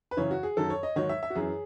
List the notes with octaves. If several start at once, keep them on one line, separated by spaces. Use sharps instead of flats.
B4
F#2 C#3 E3 C#5
F#4
G#4
F#2 D#3 F#3 A4
C#5
D#5
G#2 D#3 F#3 C#5
E5
E5
F#4
F#2 E3 G#4